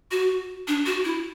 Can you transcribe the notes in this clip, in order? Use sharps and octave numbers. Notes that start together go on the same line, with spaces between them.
F#4
D4
F#4
E4